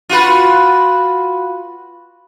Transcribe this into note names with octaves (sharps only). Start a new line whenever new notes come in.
F4 F#4 B4